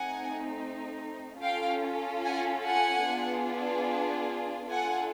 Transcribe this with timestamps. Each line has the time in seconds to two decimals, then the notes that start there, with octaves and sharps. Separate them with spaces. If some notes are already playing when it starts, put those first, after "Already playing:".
Already playing: A3 C4 D#4 F#5 G#5
1.42 C#4 F4 A4 F5 G5
2.24 F#5 G#5
2.65 F#5 G#5
3.06 B3 D4 F4 G#4
4.69 D4 F4 A4 F#5 G#5